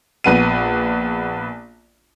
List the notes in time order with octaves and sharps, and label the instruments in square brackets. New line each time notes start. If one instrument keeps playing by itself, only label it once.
[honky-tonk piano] A#1 B3 D#7